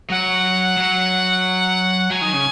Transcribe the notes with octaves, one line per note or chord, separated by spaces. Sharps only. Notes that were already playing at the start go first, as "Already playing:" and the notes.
F#3 F#5
F#3
F#3 G#5
D#3
C#3